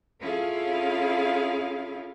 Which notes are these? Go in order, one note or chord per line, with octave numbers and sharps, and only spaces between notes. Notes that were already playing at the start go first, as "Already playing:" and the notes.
C#4 E4 F4 G#4 A4 F5